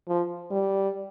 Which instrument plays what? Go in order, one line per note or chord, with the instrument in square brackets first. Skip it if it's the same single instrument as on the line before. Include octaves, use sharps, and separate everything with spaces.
[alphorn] F3
G3